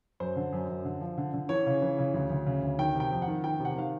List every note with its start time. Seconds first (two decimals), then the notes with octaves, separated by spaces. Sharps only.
0.20 F#2 C5
0.36 D3
0.52 F#2
0.69 F#2
0.85 D3
1.01 F3
1.18 D3
1.34 D3
1.49 E3 C#5
1.66 C#3
1.82 E3
1.98 C#3
2.14 D2
2.30 D2
2.46 C#3
2.63 D2
2.79 D#3 G5
2.95 C3
3.00 G5
3.11 F2
3.22 F#5
3.28 D#3
3.44 D#3 G5
3.60 C3
3.65 F#5
3.76 D#3 F5